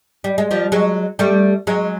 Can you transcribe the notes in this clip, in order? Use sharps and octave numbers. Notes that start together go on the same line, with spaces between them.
G3
G#3
F3 G3
F#3 G#3
G3 A3
F#3 G#3